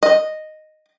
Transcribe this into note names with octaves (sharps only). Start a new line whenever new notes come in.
D#5